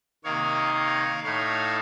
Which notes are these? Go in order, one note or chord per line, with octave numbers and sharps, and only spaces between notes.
C3 D#3 A#3 D#4 C#5 F5
C#5 F5
A2 A3 D#4 C#5 F5